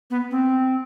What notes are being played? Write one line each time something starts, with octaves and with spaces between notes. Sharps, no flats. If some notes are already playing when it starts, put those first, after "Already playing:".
B3
C4